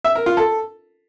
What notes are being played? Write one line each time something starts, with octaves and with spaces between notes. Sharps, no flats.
E5
A#4
F4
A4